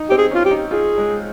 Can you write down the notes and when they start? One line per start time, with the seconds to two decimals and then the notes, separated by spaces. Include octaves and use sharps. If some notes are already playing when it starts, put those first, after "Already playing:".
Already playing: D#4
0.10 C4 G4
0.18 G#4
0.31 C#4 F4
0.45 G4
0.51 D#4
0.71 F4 G#4
0.98 G#3